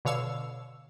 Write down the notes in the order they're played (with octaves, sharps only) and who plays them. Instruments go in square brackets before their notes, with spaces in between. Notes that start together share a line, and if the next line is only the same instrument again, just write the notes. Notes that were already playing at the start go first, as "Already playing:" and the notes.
[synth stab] B2 D3 C#5 F5 E6